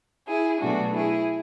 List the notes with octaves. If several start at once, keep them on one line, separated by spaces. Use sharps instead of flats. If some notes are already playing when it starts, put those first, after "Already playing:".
E4 G#4
B2 F#3 A3 D4 F#4
E4 G#4